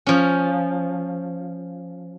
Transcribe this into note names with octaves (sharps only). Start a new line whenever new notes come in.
F3 C#4